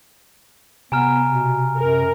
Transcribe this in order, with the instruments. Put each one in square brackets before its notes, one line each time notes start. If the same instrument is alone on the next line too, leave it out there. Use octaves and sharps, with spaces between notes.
[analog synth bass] C3 [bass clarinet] B3 [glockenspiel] G#5 A#5 F6
[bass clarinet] B2
[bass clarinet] F#2 [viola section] A#4